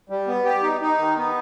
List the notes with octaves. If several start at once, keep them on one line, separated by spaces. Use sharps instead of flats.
G3
B3
G4
D#4
D#4
D#3
B3